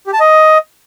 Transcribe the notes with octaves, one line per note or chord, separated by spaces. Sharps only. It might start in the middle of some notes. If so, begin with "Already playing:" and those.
G4
A5
D#5